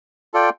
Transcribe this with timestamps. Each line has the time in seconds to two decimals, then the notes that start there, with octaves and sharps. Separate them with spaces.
0.34 F4 A4 D5 G5